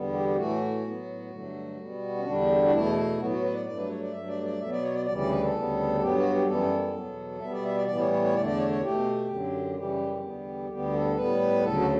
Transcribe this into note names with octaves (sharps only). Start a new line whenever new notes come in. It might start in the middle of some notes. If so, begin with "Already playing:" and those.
Already playing: E2 D3 G3 B3
G4
G4
A2 E3 A3 F#4
A2 F#3 B3
G2 D3 F#3 A3
B2 G3 B3
C#4
E2 D3 G3 D4
F#4
E2 B2 A3 E4
A2 F#3 B3 F#4
F#4
B4
D5
G2 F#3 A3 D5
B4
C#5
D5
G2 F#3 A3 E5
D5
D5
B2 F#3 B3 E5
D5
C#5
D5
D2 C#3 E3 G3 D5
D5
B4
A4
D2 C#3 G3 B3
G2 F#3 B3 G4
F#4
G4
F#2 E3 G3 B3 A4
E2 B2 F#3 B3
B2 G3 B3 E5
D5
E5
D5
A2 E3 G3 B3 D5
C#5
C#5
C#5
E2 D3 A3 D5
D5
C#5
C#5
B2 A3 G4
F#2 D3 F#3
F#2 C#3 E3 G3 G4
E2 D3 G3 B3
D2 D3 G3 B3 G4
A4
A2 G3 B3 B4
D2 C#3 F#3 A4
F#4